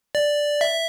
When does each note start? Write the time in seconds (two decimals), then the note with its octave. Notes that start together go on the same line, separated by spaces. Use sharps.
0.15 D5
0.61 E5